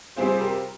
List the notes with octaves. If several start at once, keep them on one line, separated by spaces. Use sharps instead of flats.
C3 G3 C4 F4 G#4 C5
G4 A#4